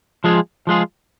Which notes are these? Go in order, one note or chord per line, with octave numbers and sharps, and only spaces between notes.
F3 G#3 F4 G#4
F3 G#3 F4 G#4